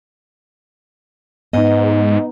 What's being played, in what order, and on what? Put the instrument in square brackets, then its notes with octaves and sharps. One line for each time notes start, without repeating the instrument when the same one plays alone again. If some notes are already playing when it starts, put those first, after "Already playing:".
[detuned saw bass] G#2 [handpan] B3 D#4 [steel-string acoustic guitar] D#5